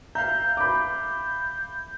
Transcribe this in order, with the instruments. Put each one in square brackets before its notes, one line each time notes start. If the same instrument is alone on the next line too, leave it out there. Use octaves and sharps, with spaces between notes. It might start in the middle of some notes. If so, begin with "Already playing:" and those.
[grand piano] E5 F5 [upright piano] A#5 [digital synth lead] G6
[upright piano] B5 D6